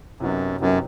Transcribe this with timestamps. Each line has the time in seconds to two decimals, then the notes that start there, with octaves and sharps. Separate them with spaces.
0.20 F#2 C3 F#3 B3 D#4 G4
0.60 F#2 C3 F#3 B3 D#4 G4